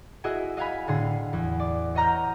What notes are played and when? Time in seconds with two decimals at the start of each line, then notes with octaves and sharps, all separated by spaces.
0.24 E4 F#4 G#4 D#5 E5
0.57 D#5 F5 F#5 G#5 B5
0.87 A2 D3 G#4 C6 C7
1.33 E2
1.60 D5
1.95 C#5 D#5 F#5 A#5 F6 G6